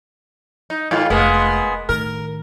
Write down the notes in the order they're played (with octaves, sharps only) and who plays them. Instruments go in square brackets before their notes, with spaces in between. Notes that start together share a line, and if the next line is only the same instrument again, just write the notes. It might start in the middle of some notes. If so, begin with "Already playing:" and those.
[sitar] D#4
G#2 D#3 F4
[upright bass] F1 [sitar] G#3 A#3 B3
[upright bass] A2 D#3 [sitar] A#4